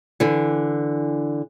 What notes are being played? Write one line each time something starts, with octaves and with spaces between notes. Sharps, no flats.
D3 E3